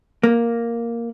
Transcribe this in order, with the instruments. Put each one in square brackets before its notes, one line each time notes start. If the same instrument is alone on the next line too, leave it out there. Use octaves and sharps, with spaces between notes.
[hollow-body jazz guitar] A#3